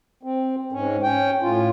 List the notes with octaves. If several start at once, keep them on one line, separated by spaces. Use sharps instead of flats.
C4
G#2 C#4
C#4 G5
A2 F4